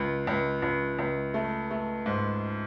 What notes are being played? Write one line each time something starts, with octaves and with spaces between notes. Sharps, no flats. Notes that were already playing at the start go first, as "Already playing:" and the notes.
Already playing: C#2
C#2
C#2
C#2
A3
A3
G#2